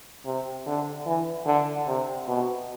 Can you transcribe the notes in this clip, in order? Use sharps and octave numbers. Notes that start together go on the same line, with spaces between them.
C3
D3
E3
D3
C3
B2